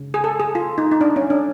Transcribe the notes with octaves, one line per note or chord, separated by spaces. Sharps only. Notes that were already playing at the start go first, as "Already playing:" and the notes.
Already playing: C#3
G#4
A4
G#4
F4
D#4
D#4
D4
C#4
D4